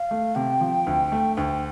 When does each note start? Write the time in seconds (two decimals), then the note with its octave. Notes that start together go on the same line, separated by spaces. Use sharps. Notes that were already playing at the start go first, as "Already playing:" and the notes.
Already playing: F5
0.11 A3
0.35 C3 G5
0.61 F3
0.86 D2
1.12 A3
1.37 D2 G5